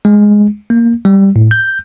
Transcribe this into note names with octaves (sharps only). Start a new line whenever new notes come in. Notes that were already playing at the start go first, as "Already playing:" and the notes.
G#3
A#3
G3
A2
G6